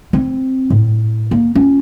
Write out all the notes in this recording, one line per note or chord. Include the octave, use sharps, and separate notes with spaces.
C4
A2
A#3
C#4 F4